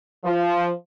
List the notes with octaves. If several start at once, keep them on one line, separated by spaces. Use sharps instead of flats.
F3